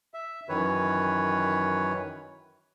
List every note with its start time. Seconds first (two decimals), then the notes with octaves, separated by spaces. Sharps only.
0.14 E5
0.49 F#2 D#3 E3 B4 C#5